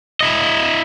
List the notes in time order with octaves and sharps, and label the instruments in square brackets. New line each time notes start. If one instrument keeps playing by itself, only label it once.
[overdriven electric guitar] E4 D#5